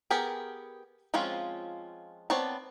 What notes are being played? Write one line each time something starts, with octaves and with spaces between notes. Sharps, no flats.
B3 G4 G#4 A#4
F3 G#3 C4 C#4 F4
B3 C4 C#5 D5 A5